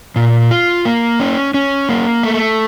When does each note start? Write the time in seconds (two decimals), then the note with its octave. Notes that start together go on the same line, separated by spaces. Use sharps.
0.16 A#2
0.51 F4
0.85 A#3
1.20 C#4
1.54 C#4
1.89 A#3
2.23 A3